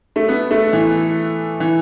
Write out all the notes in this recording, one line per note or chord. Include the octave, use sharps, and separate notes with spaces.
A3
B3
A3
E3
E3